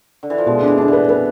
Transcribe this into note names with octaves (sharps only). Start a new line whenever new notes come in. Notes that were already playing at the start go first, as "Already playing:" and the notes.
D3
E3
F3
B2 G#3
D4
E3
D3 D4
E3 B3
E3 B3